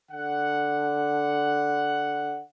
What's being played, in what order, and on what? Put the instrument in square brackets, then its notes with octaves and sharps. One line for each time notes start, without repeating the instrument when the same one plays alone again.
[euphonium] D3 [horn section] F#5